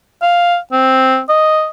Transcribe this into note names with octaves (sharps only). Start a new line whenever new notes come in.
F5
C4
D#5